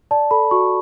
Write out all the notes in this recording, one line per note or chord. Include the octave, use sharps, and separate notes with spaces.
D5 A5
A4 B5
F#4 C#6